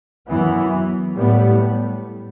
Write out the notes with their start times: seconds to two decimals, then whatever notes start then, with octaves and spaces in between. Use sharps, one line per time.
0.27 F#2 E3 B3
1.15 A2 G3 B3